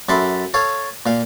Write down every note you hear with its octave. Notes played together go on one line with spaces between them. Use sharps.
F#2 A4 E5 B5 C6 D6
A4 C#5 F5
A#2 F5